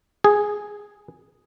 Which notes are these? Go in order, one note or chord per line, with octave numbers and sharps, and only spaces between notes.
G#4